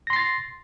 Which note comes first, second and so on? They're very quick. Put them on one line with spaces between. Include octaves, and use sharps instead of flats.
A#6 C6 C7 A6